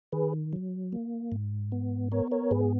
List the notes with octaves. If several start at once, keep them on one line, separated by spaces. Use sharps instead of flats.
D#3 G#4 B4
F#3
A#3
G#2
B3
B3 A#4 C#5
A#4 C#5
G#2 G#4 B4